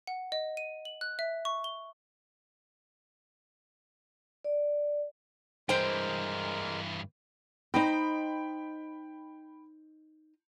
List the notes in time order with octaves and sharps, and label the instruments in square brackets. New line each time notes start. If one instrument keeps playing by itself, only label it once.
[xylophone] F#5
D#5
D#7
F#7
F#6
E5
C#6
G7
[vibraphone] D5
[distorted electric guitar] G2 E3 [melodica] G#3 A#4 [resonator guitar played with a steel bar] C5 G5
[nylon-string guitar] D#4 C5 D#5 [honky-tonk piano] G5 B5